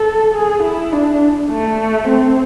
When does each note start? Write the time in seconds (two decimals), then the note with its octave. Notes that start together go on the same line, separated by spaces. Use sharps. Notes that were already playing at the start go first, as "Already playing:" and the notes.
Already playing: A4
0.35 G#4
0.63 E4
0.93 D4
1.50 A3
2.08 C4